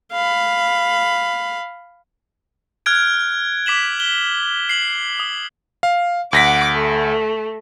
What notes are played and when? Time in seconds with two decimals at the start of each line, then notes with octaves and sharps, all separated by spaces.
0.12 F5 B5
2.86 F6 F#6 G#6 D7
3.66 D6 B6 E7 F#7
4.00 G7
4.69 C7 F#7
5.20 D#6
5.83 F5
6.33 D2 F#5 D6 A#6 B6
6.72 A3